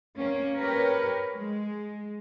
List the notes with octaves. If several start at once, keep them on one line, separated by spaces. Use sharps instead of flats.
A#3 C#4
G4 A#4 B4 C#5
G#3